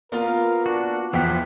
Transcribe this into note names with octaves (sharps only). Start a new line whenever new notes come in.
A#3 B3 F4 A#4 F5
D4 F#4
E2 F3 F#5 G5 B6